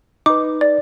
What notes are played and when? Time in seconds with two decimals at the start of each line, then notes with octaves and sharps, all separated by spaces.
0.26 D#4 B4 D6
0.61 D5